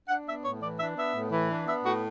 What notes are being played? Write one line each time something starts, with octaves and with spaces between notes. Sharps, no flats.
D4 F#5
B3 E5
A2 C#5
E3 D5
D4 E5
B3 E5
A2
E3
D4
B3 E5
A2 F#4